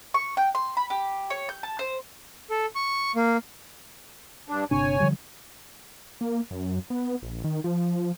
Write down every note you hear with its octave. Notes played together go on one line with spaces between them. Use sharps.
C#6
G5
C6
B5
G4
C#5
G6
A5
C5
A4
C#6
A#3
G2 D4
G1 C3 D4 C#5 G#5
D3 F3 G3
A#3
F#2
B3
A#1
D#3
F3